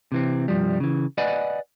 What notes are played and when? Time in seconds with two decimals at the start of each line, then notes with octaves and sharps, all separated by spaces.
0.12 C3 E3 C4
0.48 C2 G2 F3 G3
0.80 C#3 E3
1.18 B4 D5 D#5 F#5 G#5 B5